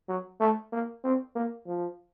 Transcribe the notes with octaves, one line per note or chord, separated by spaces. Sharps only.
F#3
A3
A#3
C4
A#3
F3